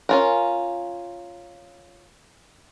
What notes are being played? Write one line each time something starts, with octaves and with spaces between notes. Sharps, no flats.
C#4 F4 A#4